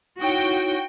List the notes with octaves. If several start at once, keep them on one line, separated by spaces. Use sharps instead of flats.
D#4 E4 F#4 C#5 G5